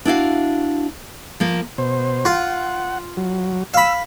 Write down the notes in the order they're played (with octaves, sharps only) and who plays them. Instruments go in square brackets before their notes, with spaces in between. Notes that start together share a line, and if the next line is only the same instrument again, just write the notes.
[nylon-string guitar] D4 E4 F#4 F5
F3 A#3
[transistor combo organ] B2 C5
[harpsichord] F4 [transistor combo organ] F#5
[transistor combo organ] F#3
[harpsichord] F5 B5 [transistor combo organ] E6